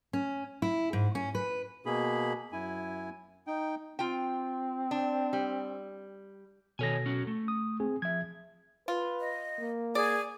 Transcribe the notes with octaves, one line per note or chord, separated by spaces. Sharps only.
C#4
E4
G#2
C#4
B4
B2 A#3 G#4 B5
F#2 E4 G#5
D#4 G5
C4 F4 G5
D4
G3
B2 D#3 A4 C#5 G#5 A#6
C#4 F#4
A3
D#6
C4 G#4
F3 E5 G#6
F4 B4
D#5
A#3
G#4 D5